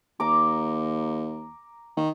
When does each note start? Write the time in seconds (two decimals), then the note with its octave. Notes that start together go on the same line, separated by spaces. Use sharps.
0.20 D#2 A#5 D6
1.97 D#3